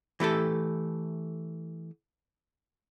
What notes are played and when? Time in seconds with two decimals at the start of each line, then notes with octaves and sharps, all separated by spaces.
0.20 E3 A3 G4 A4